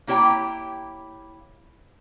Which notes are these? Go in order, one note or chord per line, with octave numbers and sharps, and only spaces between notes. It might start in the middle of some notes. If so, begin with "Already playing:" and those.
A#3 E4 G4 C#5 G5 A#5